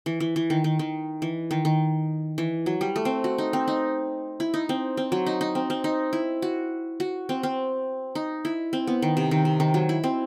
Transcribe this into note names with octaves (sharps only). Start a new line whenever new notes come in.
E3
E3
E3
D#3
D#3
D#3
E3
D#3
D#3
E3
F#3
G3
A3
C4
F#4
D#4
C4
D#4
E4
D#4
C4
C4
F#3
D#4
D#4
C4
C4
D#4
E4
F#4
F#4
C4
C4
D#4
E4
C4
B3
D#3
C3
D#3
C3
D#3
F#3
E4
C4